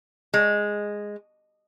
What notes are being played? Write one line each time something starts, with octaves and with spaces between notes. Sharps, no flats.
G#3